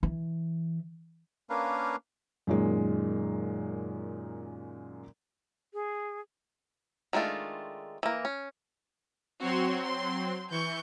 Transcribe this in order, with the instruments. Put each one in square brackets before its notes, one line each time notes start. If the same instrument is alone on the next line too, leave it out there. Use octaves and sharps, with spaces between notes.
[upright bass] E3
[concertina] A#3 C#4 D4 A#4 B4 F5
[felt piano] F#2 A#2 D#3 G#3
[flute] G#4
[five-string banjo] D#3 G#3 A3 D4 F4
E3 A#3
C#4
[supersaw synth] F#3 C4 [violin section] F#4 C#5 C6
[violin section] C6
[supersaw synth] E3 [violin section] C#6 G6